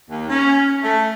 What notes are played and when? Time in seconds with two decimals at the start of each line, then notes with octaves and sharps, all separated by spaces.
0.09 D#2
0.29 C#4
0.82 A3